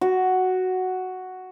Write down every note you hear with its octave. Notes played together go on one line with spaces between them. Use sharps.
F#4